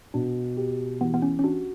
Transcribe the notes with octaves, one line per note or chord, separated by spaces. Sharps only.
B2 D4
G4
E3 B3
B3
C#4
C#4
D4 F#4